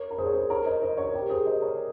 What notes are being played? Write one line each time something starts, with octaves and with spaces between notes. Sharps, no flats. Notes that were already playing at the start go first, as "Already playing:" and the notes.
Already playing: A#4 C#5
A#4
G#4 C5
C#5
G#4 C5
A#4 C#5
C5 D#5
C5 D#5
A#4 C#5
C5
G4 A#4
G#4 C5
C5 D#5
A#4 C#5